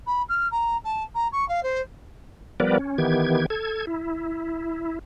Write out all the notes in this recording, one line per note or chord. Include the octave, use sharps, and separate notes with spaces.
B5
F6
A#5
A5
A#5
C#6
F5
C5
F3 G3 B3 A#4 B4 D5
C#4
D#3 E3 B3 G4 G#6
A4 G#6
E4